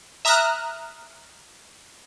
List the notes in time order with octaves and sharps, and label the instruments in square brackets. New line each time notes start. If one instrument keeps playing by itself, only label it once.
[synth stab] E5 A#5 D#6 F6 F#6